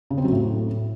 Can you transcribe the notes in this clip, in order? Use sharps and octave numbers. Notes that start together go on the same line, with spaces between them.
C#3
C4
F#3
A2